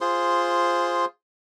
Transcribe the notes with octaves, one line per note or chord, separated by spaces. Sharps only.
F4 G#4 C5 C6